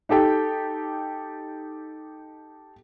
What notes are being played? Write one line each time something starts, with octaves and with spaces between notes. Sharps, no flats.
D#4 G4 A4 G5